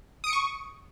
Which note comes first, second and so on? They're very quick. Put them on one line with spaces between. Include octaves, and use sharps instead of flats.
D#6 D7 C#7 C#6